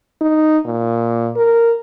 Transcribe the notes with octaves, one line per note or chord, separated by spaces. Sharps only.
D#4
A#2
A#4